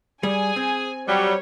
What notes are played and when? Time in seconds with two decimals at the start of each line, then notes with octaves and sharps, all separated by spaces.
0.23 G3 G#4 G#5
0.56 C4
1.08 F#3 G3 C#5